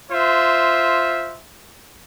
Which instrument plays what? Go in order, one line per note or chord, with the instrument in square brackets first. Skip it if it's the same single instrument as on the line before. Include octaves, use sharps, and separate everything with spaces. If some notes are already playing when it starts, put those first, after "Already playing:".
[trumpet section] F4 C5 E5